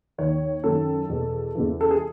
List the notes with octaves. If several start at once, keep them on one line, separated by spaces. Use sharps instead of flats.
D#2 D#3 C#5
F#2 D#3 A4
E2 B2
E2 C#3 E3
A4
G#4